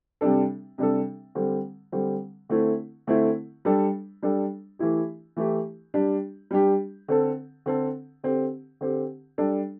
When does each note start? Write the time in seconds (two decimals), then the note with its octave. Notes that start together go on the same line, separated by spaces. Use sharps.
0.21 C3 G3 D4 A4
0.78 C3 G3 D4 A4
1.35 D3 G3 C4
1.92 D3 G3 C4
2.49 D3 A3 C4 E4
3.07 D3 A3 C4 E4
3.65 G3 D4 A4
4.22 G3 D4 A4
4.79 E3 A3 E4 G4
5.37 E3 A3 E4 G4
5.94 G3 D4 G4
6.51 G3 D4 G4
7.08 D3 C4 A4
7.66 D3 C4 A4
8.24 D3 C4 G4
8.81 D3 C4 G4
9.38 G3 D4 A4